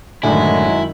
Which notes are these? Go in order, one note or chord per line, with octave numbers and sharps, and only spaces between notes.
F#2 A2 D3 D#3 F#3 G#3 E4 G#5